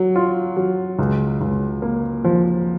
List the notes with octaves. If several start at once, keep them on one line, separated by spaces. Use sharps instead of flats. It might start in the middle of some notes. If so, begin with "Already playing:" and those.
Already playing: F#3
F4
F#3
C#2
C#2
A#3
F3